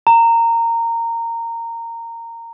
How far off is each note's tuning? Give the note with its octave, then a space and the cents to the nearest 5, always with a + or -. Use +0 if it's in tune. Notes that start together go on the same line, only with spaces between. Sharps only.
A#5 -15